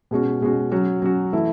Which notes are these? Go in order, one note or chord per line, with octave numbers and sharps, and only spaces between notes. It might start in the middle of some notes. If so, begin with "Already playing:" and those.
B2 G#3 C#4 F#4
B2 G#3 C#4 F#4
F#3 C#4 F#4
F#3 C#4 F#4
E3 A3 E4